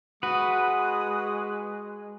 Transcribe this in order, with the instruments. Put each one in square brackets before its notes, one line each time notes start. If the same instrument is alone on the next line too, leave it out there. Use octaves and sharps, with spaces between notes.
[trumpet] G#3 [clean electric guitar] F#4 [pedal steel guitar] B4 [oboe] D#6